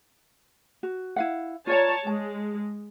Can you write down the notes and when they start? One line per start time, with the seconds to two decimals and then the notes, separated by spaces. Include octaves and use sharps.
0.83 F#4
1.16 E4 F5 F#5
1.67 F4 C#5 D5 A5 A#5
2.07 G#3 A5